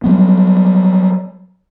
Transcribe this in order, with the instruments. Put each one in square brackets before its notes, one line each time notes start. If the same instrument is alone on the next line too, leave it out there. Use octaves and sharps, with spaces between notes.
[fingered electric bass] F#3 G3 B3